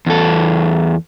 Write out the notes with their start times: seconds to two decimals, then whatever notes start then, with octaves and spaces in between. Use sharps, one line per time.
0.07 E2 A4